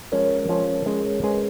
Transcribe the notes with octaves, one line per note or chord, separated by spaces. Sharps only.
F3 G#3 C#4 A#4 C#5
F3 G#3 C#4
G#3 C#4 G#4
G#3 C#4 G#4 B4 D#5